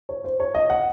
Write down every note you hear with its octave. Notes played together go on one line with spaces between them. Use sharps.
C#5
C5
C#5
D#5
F#5